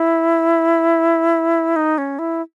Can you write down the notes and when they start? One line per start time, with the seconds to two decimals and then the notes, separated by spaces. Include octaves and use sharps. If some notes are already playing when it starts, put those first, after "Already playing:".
Already playing: E4
1.76 D#4
1.98 C#4
2.19 E4